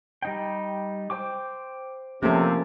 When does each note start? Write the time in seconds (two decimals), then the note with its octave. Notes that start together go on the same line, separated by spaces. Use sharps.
0.22 G3 D#4 G5
1.10 C5 G5 D6
2.23 C3 F3 A3 A#3 C#4 A4